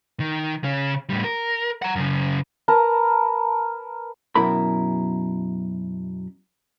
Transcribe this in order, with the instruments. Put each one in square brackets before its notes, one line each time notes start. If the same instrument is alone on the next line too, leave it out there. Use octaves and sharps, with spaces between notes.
[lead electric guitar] D#3
C#3 C#4
A2 G3
A#4
F#5 A#5
F#2 C#3
[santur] A#4 B4 A5 A#5
[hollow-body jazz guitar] F#2 B2 E4 A#4 B5